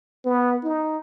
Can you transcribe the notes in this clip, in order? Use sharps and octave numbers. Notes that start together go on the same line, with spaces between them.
B3
D#4